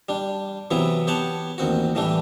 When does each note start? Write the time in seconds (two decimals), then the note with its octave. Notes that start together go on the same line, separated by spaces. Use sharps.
0.09 G3 D4
0.71 C3 E3 F#3 B3 E4
1.07 B3 G4 C#5 F#5 A5
1.58 A1 D#2 C4 F#4
1.95 A2 E3 G3 A3 D4